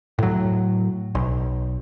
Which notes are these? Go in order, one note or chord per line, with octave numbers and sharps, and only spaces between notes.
A2 F#3
B1